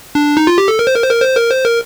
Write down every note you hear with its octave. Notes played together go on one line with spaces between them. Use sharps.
D4
D#4
F4
G4
A4
A#4
C5
A#4
C5
A#4
C5
A#4
C5
A#4